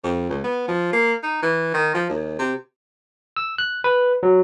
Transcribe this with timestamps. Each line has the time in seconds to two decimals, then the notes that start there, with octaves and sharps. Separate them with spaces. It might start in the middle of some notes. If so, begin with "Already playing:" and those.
0.03 F2
0.29 C#2
0.44 B3
0.68 F3
0.92 A#3
1.23 D#4
1.42 E3
1.74 D#3
1.94 F3
2.09 D#2
2.39 C3
3.37 E6
3.58 F#6
3.84 B4
4.23 F#3